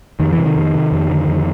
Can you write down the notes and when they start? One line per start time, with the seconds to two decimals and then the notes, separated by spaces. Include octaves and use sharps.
0.20 F2 D#3
0.33 E3
0.38 C3
0.45 D#3
0.56 F2
0.74 C3
0.92 F2
1.10 D3
1.28 F2